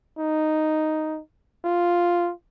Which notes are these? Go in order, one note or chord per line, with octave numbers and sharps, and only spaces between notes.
D#4
F4